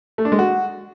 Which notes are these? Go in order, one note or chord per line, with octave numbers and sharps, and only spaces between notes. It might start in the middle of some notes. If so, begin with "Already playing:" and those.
A3
D4
G#3
F#4